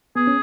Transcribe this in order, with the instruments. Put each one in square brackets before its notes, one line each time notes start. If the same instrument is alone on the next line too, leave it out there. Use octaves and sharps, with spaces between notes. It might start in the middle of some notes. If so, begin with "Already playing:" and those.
[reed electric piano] B3 [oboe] G#4
[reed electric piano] C#4